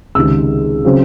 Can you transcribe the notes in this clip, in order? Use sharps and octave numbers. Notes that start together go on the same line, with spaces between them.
C#2 C3 D#3 G#3 E6
C#3 F#3 C4